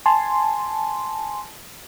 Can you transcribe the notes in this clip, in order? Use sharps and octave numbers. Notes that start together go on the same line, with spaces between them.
G#5 A5 C6